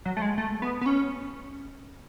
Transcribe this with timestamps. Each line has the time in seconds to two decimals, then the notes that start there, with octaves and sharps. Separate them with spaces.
0.05 F#3
0.17 A3
0.22 G#3
0.38 A3
0.62 B3
0.81 B3
0.86 C#4